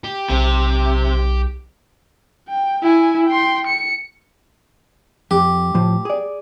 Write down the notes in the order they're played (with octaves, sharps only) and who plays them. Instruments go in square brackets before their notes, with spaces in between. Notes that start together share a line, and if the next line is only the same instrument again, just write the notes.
[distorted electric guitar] G4
[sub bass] B1 [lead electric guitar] C3
[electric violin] G5
E4 G#5
G5 C6
C#7
[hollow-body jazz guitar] F2 [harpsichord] G4
[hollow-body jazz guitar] A2 F3
G#4 D5